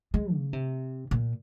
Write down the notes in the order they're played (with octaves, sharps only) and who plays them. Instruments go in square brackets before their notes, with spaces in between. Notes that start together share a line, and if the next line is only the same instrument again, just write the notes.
[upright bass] G#3
C#3
C3
A#2